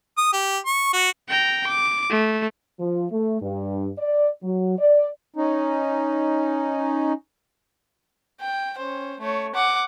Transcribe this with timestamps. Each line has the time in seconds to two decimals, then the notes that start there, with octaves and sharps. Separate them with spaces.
0.17 D#6
0.33 G4
0.66 C#6
0.93 F#4
1.29 G5 A#5
1.67 D6
2.10 A3
2.80 F3
3.10 A3
3.42 G2
3.98 D5
4.43 F#3
4.79 D5
5.36 C#4 D#4
8.41 G5
8.77 C#4 C5
9.20 A3 C#5
9.55 F#5 D6